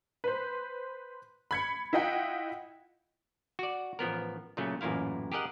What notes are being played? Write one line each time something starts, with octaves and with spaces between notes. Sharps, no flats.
B4 C5
B5 G#6 C#7
E4 F4 D#5 F#5 G5
F#4 D5
A1 F3 B3 A#4
A#2 C#3 F#3 A3 C#4
A1 F#2 A#2 E4 F5
G4 G#4 A#4 D#5 F#5